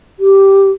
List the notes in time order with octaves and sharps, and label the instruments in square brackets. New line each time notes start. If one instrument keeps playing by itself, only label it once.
[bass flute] G4